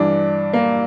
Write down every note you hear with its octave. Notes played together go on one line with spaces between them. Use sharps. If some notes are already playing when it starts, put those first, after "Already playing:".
Already playing: G2 E3 D4
A#3